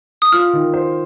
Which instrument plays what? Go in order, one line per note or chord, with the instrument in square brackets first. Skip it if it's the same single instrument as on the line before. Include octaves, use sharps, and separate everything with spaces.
[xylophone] D#6
[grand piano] F4 [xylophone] F6
[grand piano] D#3
C5